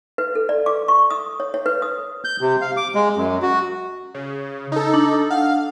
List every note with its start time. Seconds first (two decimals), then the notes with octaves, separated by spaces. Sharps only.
0.18 B4
0.35 A4
0.49 D5
0.66 D6
0.88 C#6
1.10 D#6
1.40 C#5
1.54 C#5
1.66 B4
1.82 D#6
2.25 G6
2.41 C3
2.61 F5
2.77 D6
2.95 G#3
3.17 F#2
3.42 F#4
4.14 C#3
4.72 D#4 A4
4.94 D4
5.30 F5 F#5